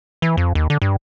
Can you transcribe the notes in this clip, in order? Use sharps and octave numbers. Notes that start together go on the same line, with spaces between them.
E3
F2
D#2
D3
G2